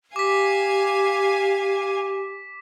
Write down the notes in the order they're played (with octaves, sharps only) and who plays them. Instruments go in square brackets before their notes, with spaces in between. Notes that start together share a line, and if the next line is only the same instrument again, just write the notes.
[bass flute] G4 [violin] F5 G#5 [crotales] D6 B6